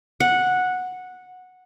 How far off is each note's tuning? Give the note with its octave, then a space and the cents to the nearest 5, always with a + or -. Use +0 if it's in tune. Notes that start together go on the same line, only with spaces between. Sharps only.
F#5 -10